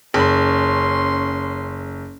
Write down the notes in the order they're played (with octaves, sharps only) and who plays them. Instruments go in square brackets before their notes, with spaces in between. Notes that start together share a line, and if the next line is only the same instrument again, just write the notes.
[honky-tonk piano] F#1 [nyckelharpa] C#4 C6